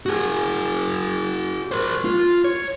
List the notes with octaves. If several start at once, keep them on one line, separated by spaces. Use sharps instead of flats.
F#4 G#4
A#4 C5
F4
C#5